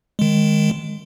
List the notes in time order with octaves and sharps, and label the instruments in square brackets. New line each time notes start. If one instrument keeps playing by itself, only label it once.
[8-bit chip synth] D#3 G#3